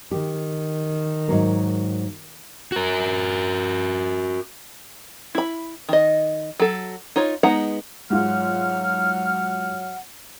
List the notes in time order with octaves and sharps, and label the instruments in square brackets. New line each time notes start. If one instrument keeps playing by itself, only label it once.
[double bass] D#3 [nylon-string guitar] G4
[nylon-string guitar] G#2 F#3 A#3
[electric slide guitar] F#4 A#4
[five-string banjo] E4 B5
D#3 D#5
F#3 A4
D#4 F4 C#5
G#3 B3 D#4 F#5 A#5
[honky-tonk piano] G#2 F4 [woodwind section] F#3 F6 [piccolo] F#5